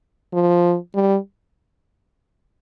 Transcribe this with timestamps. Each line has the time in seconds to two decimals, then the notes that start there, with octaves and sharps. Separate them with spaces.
0.33 F3
0.95 G3